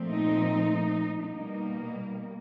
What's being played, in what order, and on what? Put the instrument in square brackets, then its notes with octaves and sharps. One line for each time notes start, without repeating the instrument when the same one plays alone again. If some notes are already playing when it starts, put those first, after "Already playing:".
Already playing: [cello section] A#2 F3 A3 C4
D#4
B2 G3 A#3 D#4